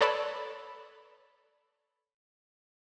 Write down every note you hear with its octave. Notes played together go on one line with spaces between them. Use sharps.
A4 B4 C#5 D5 A5 B5